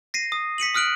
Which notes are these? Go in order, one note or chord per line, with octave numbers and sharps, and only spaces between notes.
A#6 C7 D#7
D#6
B6 C#7 D#7 F#7
D#6 F6 F#6 D7 F#7